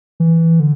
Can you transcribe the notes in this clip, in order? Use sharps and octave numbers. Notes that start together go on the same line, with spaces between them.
E3
D3